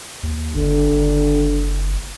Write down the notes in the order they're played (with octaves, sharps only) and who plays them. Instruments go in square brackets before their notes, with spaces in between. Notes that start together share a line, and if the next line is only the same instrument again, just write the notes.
[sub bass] D#2
[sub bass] F#1 [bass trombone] D3
[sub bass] F#1